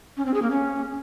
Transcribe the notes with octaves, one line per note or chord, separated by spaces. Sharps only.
C#4
C4
G#4
A#3
C#4